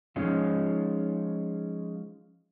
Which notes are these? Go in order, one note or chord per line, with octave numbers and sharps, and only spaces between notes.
F3 G#3 C#4 D#4 F4